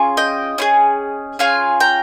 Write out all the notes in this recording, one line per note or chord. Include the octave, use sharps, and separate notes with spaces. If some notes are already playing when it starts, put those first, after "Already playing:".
Already playing: C#4 F4 G#4
D#5 G5
C#4 F4 G#4
C#4 F4 G#4 F5 G#5
G5 A#5